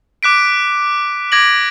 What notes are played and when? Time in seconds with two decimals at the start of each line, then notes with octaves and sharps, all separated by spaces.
0.23 D6 F#6 B6 D7
1.32 D6 G#6 A#6 D7 F#7